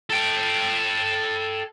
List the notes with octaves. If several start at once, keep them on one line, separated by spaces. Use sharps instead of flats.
A4 G5